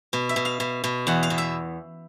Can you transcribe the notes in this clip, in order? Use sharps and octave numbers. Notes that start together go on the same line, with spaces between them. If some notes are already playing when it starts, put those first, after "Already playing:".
B2
E5
B2
F5
B2
B2
E2 F#5
F5
B2
E5